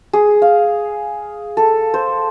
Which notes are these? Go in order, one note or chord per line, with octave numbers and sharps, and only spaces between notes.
G#4
F5
A4
C5